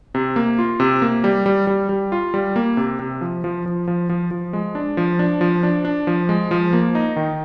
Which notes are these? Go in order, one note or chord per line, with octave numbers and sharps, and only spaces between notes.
C3
A#3
F4
C3
A#3
G3
G3
G3
G3
F4
G3
A#3
C3
C3
F3
F3
F3
F3
F3
F3
G#3
D4
F3
D4
F3
D4
D4
F3
G#3
F3
A#3
D#4
D#3